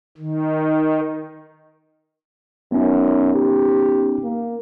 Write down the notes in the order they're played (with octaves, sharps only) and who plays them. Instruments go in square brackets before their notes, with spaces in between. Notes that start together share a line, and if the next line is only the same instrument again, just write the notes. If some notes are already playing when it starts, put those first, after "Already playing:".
[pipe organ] D#3
[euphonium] F#2 [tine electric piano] B3 C#4 D#4
[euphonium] G4
A#3